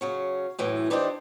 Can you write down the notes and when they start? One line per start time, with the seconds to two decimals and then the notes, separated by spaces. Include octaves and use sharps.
0.01 C#3 F#3 C#4
0.59 F#2 A2 E3
0.90 E3 D4 D#4 G4 B4 C5